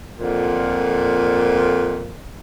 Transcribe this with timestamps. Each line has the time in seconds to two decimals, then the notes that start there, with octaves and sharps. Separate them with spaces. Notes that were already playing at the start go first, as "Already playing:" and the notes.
0.19 F2 A#2 D3